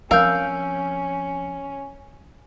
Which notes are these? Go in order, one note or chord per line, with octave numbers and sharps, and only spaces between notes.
F3 C4 C#4 A#4 F5 E6 G6